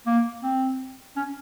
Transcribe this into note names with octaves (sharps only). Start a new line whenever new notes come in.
A#3
C4
C#4